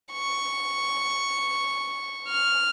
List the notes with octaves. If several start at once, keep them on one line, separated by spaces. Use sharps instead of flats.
C#6
F6